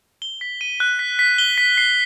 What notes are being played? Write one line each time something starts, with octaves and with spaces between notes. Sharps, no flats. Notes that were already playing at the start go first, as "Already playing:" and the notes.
G7
B6
D#7
F#6
B6
B6
G7
B6
C7